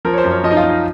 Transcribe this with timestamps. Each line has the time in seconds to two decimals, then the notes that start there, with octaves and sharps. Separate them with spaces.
0.05 F3 A#4
0.13 C#5
0.18 C5
0.24 F#2
0.31 C#5
0.44 F3 D#5
0.51 D#4
0.57 F4
0.64 F3
0.70 D#4